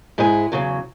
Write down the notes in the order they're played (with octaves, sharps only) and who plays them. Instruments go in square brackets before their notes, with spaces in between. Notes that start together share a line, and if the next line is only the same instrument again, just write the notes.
[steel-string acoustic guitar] G#2 G#3 E4 G#4
E2 C#3 F#3